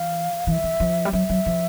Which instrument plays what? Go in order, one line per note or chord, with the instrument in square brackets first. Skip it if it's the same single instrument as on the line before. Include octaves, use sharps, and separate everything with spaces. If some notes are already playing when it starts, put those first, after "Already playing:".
Already playing: [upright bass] E3 [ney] F5
[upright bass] E3 [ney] F5
[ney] E5
[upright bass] E3
F3
G3
[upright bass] F#3 [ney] E5
[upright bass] F#3
F3